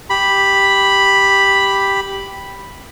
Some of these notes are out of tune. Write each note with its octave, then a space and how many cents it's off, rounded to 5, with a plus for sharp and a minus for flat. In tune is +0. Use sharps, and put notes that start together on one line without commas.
G4 +0 B5 +0